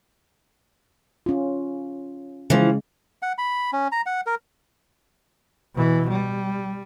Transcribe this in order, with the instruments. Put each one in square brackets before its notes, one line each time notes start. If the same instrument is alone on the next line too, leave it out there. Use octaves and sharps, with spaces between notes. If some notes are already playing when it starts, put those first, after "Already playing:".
[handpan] C#4 F4
[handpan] C#3 G#3 [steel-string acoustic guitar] E3 F3
[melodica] F#5
B5
C#4
A#5
F#5
A#4
[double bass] B2 E3
G3